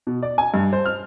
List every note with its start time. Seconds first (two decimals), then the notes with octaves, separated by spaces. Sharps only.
0.07 B2
0.23 D5
0.38 G#5
0.54 G2
0.73 C5
0.85 F6